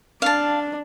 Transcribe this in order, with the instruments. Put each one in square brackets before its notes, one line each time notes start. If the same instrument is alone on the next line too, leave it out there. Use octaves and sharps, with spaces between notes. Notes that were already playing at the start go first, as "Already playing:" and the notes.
[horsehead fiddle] D4 [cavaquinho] F5 A5